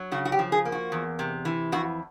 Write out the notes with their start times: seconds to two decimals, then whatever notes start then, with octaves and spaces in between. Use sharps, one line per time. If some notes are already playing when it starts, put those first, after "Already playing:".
Already playing: F#3
0.12 C#3 F#4
0.25 F#4
0.32 G4
0.39 F3
0.52 G#4
0.65 A#3
0.72 F#4
0.92 E2
1.19 C3
1.45 E3
1.72 F2 F#4